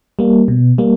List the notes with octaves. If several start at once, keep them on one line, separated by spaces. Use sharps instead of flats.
G3 A#3
B2
G3 A#3